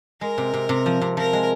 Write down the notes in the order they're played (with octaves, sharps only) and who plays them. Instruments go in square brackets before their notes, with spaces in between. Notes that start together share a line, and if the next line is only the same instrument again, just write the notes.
[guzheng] G#3 [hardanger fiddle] A#4
[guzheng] C3
C3
C3
F3
C3
[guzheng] F3 [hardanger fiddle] A#4
[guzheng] G#3